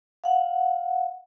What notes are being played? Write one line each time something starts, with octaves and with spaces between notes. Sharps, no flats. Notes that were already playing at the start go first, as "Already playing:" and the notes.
F5 F#5